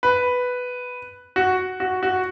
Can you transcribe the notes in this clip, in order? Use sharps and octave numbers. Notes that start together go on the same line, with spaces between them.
B4
F#4
F#4
F#4